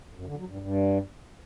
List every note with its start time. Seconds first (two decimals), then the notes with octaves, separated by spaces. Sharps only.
0.15 F#2
0.26 D3
0.37 F#3
0.48 G2
0.59 G2